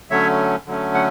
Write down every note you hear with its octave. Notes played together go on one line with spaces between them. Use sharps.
D3 F#3 A3 C#4 C#5 E5
D3 F#3 A3 C#4
F#5